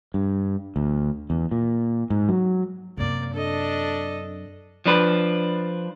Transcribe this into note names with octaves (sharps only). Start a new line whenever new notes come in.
G2
D2
E2
A#2
G#2
F#3
F#2 C3 A#3 D5
D4 A4 D#5
F3 D4 B4